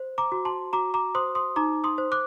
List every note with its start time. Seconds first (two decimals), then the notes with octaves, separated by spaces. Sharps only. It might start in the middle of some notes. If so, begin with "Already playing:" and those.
Already playing: C5
0.18 A#5 D6
0.32 F#4
0.45 A5 C6
0.73 F#4 A#5 D6
0.94 A#5 D6
1.15 C5 C6 D#6
1.35 C6 D#6
1.56 D#4 A#5 D6
1.84 C6 D#6
1.98 C5
2.12 D6 F#6